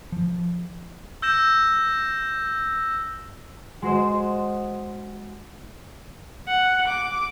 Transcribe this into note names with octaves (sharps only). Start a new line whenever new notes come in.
F3
E6 G6 A#6 E7
G#3 F#4 C5 D#5
F#5
D6